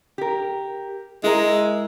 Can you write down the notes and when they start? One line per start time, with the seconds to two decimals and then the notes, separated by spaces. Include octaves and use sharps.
0.18 G4 A#4
1.23 G#3 E4 A#4